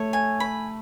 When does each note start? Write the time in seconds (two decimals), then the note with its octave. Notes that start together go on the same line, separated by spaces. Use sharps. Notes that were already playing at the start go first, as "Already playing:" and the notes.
Already playing: A3 C#5
0.13 G#5
0.40 B5